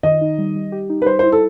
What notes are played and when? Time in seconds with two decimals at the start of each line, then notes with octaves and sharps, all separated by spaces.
0.03 D#3 D#5
0.21 D#4
0.38 G3
0.56 G3
0.72 G4
0.90 D#4
1.02 B4
1.06 G3 C5
1.19 C5
1.23 E4
1.32 A4